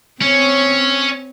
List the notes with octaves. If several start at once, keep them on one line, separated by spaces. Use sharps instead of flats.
C4 C#4 C#5